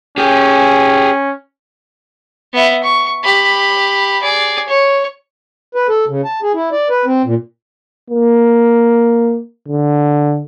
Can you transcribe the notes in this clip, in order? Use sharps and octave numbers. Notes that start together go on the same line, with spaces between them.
C#4 G4 G#4
B3 E5
C#6
G4 B5
G#4 D5
C#5
B4
A4
C#3
A5
G#4
E4
D5
B4
C4
A#2
A#3
D3